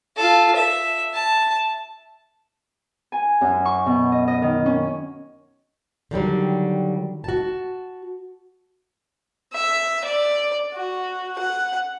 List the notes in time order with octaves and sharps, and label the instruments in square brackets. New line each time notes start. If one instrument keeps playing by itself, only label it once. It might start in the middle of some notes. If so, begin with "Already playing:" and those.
[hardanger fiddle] F4 A4
E5
A5
[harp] G#5
F#2
C#6
B2
D#5
D#5
D#3
C#4
[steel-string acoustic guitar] D3 D#3 F#3 G3
F#4 A5
[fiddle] E5
D5
F#4
F#5